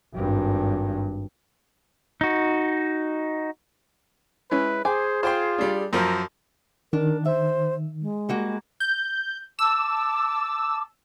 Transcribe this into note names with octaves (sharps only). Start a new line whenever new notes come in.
G#1 G2
D#4 F#4
G#3 C#4 E4 B4
G#4 C5 G#5 D6
F4 C5 G5 C6
G3 D4
F#2 F3 A#4
D#3 D4 A#4
C5 E5
G#3
G3 A#3 F#4
G6
A5 D6 E6